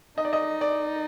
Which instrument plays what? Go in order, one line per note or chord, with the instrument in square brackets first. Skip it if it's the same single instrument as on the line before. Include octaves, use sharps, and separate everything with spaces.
[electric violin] D#4 [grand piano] D#5
[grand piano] D5
D#5
D5